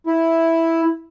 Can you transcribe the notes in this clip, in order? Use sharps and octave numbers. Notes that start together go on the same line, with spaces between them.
E4